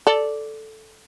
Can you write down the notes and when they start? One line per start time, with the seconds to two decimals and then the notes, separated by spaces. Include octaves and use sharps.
0.07 A4 D5